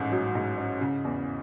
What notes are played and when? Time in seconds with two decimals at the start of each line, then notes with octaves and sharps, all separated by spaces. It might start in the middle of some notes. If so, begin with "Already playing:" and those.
Already playing: A1 G#2 C#4
0.12 F#3
0.35 G#2
0.58 C#4
0.81 C#3
1.05 E2